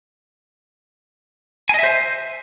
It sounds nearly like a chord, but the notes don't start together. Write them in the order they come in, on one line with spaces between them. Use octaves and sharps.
G#5 D#5 E5 C5